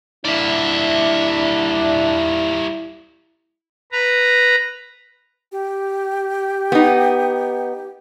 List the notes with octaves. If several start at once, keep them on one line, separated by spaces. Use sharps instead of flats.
G3 A#3 D4 E4 D5 E5
B4 A#5
G4
B3 D#4